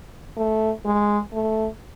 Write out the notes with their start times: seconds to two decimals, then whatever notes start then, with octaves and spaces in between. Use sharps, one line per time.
0.37 A3
0.85 G#3
1.33 A3